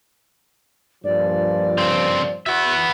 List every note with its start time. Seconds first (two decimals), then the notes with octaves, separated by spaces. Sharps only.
1.04 G2 A#2 F3 D5
1.78 C#3 C4
2.46 B3 F#4 E5